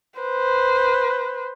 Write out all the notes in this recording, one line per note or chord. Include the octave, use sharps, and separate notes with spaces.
B4 C5